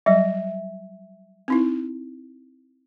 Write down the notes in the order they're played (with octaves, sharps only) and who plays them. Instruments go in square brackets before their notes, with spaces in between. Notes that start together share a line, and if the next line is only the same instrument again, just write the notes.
[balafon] F#3 G3 [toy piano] E5
[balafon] C4 D#4 E4